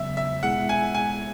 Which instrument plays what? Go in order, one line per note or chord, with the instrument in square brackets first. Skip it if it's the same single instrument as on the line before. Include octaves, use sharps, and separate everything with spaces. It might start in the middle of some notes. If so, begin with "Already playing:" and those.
Already playing: [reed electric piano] E2 C#3 F#3 B3 [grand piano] E5
[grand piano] E5
[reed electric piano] B2 G#3 B3 E4 G#4 [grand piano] F#5
[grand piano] G#5
G#5